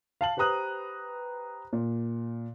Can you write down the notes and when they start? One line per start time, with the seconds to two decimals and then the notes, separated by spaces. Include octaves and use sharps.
0.21 F5 A5 F#7
0.37 G4 B4 C5 A#5 D#6 F#6
1.73 A#2